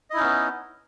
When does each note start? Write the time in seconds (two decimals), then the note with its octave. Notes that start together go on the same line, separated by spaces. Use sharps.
0.10 D#5
0.13 E4
0.17 D#4
0.20 C#4
0.23 B3